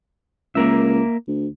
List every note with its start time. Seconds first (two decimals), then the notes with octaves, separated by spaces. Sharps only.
0.55 C#2 A#3 A#4 E5
1.28 D2